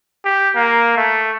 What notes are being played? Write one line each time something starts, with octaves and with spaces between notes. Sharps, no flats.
G4
A#3
A3